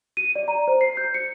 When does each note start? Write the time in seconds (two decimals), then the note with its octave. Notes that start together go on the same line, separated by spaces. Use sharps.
0.17 D#7
0.36 D5
0.48 A#5
0.68 C5
0.81 C7
0.97 G6
1.14 C#7